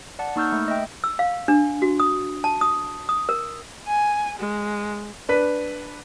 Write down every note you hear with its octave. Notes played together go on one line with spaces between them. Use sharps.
D5 F#5 A5
A#3 D#4 C#6 E6 F6 G6
A3
D#5 E5 G5
E6
F5
D4
F#4
D#6
A5
D#6
D#6
A#4
G#5
G#3
D4 B4 B6